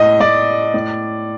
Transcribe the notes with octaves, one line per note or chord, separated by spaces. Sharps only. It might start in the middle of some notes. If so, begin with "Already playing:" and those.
Already playing: A2 D#5
A2 D5
A2